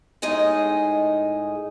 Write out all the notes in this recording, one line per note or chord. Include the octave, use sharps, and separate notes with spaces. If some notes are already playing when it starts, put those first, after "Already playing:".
A2 G#3 D#4 G#4 D#5